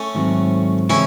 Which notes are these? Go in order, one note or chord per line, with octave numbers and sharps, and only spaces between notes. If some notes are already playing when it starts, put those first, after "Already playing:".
Already playing: A3 C#4
G#2 D#3 F#3 C4
C#3 E3 G#3 C4 C#4 E4